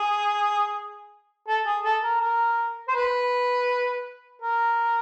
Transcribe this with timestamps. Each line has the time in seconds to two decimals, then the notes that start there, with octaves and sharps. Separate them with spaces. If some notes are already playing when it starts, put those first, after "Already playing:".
Already playing: G#4
1.48 A4
1.66 G#4
1.84 A4
2.03 A#4
2.21 A#4
2.88 C5
2.95 B4
4.42 A#4